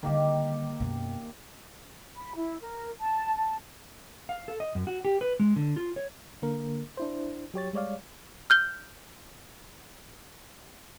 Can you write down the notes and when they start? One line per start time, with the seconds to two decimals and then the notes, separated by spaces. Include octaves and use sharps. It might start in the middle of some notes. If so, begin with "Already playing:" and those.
0.03 D3 D#3 G3 A#3 G4
0.80 F#2 B2
2.16 B5
2.36 E4
2.61 A#4
3.00 A5
3.36 A5
4.29 F5
4.48 A4
4.60 D#5
4.75 F#2
4.87 F#4
5.05 G4
5.21 B4
5.40 G#3
5.56 D3
5.76 F4
5.96 C#5
6.42 D3 A#3 A#4
6.97 D4 E4 C5
7.54 F#3 G4 C#5 A6
7.73 G3 G#3 C#5 D5 F5
8.50 F6 G6 G7